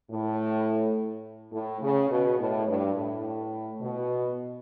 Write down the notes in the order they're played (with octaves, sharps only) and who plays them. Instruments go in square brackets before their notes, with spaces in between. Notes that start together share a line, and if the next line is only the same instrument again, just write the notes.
[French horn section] A2
A2
C#3
B2
A2
G2
A2
B2